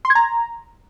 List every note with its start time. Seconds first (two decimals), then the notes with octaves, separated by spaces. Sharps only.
0.05 C6
0.10 G#6
0.15 A#5